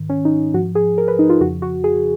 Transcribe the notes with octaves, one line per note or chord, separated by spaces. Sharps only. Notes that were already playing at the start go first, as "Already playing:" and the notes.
Already playing: G#2 D#3
C#4
D#4
G#2 F3 F#4
G#4
A#4
B4
D#4
F4
F2 C#3 F3 F#4
F#4
G#4